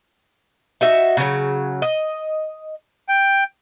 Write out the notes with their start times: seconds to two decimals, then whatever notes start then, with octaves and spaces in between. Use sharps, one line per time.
0.81 D#4 F#4 E5
1.17 C#3 F#3
1.82 D#5
3.09 G5